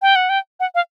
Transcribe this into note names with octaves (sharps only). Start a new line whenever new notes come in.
G5
F#5
G5
F#5
F5